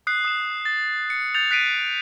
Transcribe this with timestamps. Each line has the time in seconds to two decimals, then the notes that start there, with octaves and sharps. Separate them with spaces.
0.07 D#6 F#6 C7
0.24 D#6 E7
0.65 A6
1.10 C#7
1.34 F#6 G6 A6 C#7 F7
1.51 F#6 B6 C7 D7 D#7